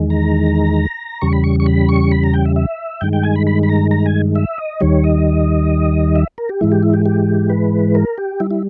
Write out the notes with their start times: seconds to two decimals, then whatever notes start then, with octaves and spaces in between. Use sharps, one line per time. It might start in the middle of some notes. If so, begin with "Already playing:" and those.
Already playing: E2 D#3 G#3
0.10 A#5
1.21 E2 C#3 G3 C#6
1.33 B5
1.44 C#6
1.60 C#6
1.66 B5
1.89 C#6
2.12 B5
2.24 A#5
2.34 G5
2.45 E5
2.56 E5
3.01 G2 D#3 G#3 G5
3.13 G5
3.23 G#5
3.36 B5
3.47 B5
3.63 B5
3.69 A#5
3.91 A#5
4.06 G#5
4.36 E5
4.58 D#5
4.81 D#2 D#3 G3 C#5
5.04 D#5
6.16 E5
6.38 A#4
6.49 G4
6.61 G#2 E3 G#3 E4
6.72 G4
6.83 E4
6.94 G4
7.06 G4
7.50 B4
7.95 A#4
8.18 G4
8.40 G3 E4
8.51 E4